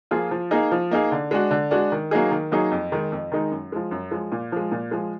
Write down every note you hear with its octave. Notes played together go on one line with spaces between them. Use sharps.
F3 A#3 F4 G#4
F3
A#3 D#4 G#4
F3
A#3 D#4 G#4
D3
G#3 D4 F#4
D3
G#3 D4 F#4
D#3
F#3 A#3 D#4 G#4
D#3
F#3 A#3 D#4 G#4
F2
D#3 G#3 D#4
F2
D#3 G#3 D#4
F#2
F3 G#3
F#2
F3 G#3
A#2
F3 G#3
A#2
F3 G#3